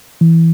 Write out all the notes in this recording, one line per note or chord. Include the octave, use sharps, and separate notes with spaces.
E3